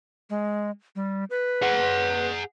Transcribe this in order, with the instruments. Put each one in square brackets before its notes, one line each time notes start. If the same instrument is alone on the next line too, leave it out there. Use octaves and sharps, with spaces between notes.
[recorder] G#3
G3
B4
[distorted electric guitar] G#4 F#5